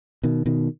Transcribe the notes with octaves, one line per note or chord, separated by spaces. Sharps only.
B2 D#3
B2 D#3